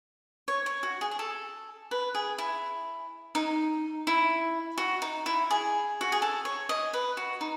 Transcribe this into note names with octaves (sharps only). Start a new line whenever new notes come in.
C#5
C#5
F#4
G#4
G#4
A4
B4
G#4
E4
D#4
E4
F#4
D#4
E4
G#4
F#4
G#4
A4
C#5
D#5
B4
F#4
D#4